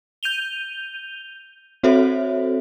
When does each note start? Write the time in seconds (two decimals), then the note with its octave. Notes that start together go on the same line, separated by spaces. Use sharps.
0.23 G6 D#7 F7 G7
1.83 C4 F#4 A4 C5 C#5 E5